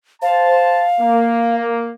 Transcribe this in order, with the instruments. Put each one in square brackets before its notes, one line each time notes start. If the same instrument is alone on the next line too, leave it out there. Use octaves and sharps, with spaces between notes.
[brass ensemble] C5 A5 [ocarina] F5
[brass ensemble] A#3